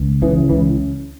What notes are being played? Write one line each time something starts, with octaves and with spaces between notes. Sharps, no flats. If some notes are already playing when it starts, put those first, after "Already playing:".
Already playing: C#2
C#3 E3
C#2 E3